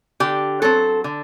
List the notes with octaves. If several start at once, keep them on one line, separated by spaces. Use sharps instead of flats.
D3 G4
F#3 C4 A4
D3